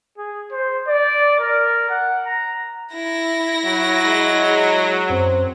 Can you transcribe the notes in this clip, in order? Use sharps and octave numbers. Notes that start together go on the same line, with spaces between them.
G#4
C5
D5
A#4
F#5
A#5
E4 A#6
F#3
G#3
F#2 C4